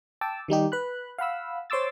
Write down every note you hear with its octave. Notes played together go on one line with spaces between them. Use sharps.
G5 A5 D6 E6
D#3 G3 D#4 G4
B4 B5 F#6
F5 F#5 B5 E6
C5 C#5 C6 D6 E6 A6